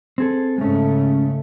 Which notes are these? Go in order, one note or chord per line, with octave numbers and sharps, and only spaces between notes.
C4 G#4 A4
G#2 C#3 G#3 A3 C#4